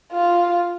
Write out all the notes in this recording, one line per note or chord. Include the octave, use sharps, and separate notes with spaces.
F4